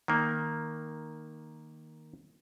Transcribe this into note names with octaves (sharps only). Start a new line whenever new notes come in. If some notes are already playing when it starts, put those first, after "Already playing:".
D#3 A#3